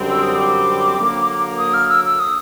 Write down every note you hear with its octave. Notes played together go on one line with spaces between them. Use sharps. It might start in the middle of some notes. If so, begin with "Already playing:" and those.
Already playing: F#2 D3 G3 C4
E6
D#6
D6
D3 F#3 A#3
D#6
F6
E6
E6
D#6